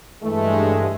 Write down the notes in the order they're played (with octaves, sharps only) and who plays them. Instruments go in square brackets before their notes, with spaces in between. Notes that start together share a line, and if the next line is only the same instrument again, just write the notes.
[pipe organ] G2 G#3 [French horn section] E3 A3